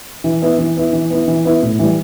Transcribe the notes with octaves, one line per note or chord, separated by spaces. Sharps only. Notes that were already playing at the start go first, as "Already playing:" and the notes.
E3
B3 E4
E3
B3 E4
E3
B3 E4
E3
B3 E4
A2
E3 G3